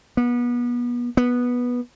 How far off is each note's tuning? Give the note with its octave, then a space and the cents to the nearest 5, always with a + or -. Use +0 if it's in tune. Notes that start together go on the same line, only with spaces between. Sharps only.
B3 -30
B3 -10